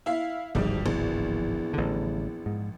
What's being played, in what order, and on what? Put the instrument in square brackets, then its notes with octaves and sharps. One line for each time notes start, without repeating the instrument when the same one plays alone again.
[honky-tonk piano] E4 E5 F5
[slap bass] D1 G#1 [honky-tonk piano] F2 G3 [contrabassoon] G#2
[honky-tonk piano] A#1 [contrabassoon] E2
[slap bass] A1 D3
G#2